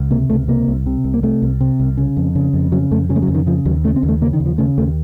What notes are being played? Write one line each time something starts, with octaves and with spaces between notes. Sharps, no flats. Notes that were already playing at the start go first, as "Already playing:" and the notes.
Already playing: C#2
C3 A#3
C#2 A3
C3 A#3
C2
C3
C2
A#3
C3 A3
C2
C3
C2
C#3
F2
C#3
F2
C#3 F#3
F2 A3
C#3 F#3
A3
F#3
F2
D#3
C#3 F3
D#2 F#3
C#3 A3
C4
D#2
A3
C#3 A#3
D#3
D#2
F3
C#3 A3
D#2 A3